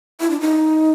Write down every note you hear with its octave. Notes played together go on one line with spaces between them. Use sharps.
E4
D4
D#4